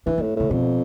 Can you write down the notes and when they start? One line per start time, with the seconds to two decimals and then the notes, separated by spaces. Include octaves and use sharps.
0.06 E3 D4
0.18 C4
0.21 A2
0.36 A2 C3
0.51 F2 B2